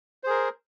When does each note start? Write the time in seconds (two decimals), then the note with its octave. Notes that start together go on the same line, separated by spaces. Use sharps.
0.23 C5
0.27 G#4
0.30 A#4